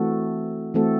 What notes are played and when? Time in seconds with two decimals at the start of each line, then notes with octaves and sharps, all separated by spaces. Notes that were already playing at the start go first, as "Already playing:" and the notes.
Already playing: E3 A3 C4 F#4 A4
0.74 E3 A3 C4 F#4 A4